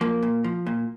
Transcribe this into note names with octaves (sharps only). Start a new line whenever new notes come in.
F3 A#3
A#2
F3
A#2